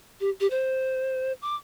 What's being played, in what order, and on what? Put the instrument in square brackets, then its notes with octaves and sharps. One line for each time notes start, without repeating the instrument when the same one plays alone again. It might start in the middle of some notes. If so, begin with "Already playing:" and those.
[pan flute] G4
G4
C5
D6